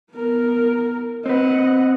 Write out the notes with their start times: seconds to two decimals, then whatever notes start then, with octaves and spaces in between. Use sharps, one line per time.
0.12 B3 A#4
1.26 C4 B4 D#5 F#5